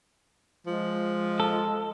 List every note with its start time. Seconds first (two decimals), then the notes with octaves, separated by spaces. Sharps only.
0.66 F3 G#3
1.40 A4